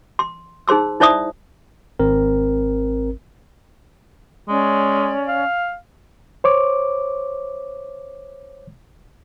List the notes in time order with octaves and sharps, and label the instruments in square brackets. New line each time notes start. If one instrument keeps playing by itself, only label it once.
[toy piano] C6
D#4 G#4 C5 C6 E6
D#4 E4 C5 D5 E5 D#6
[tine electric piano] G#1 C4 A#4
[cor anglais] G#3 [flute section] C#4 C#5 D5
[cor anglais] F5
[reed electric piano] C5 C#5 D6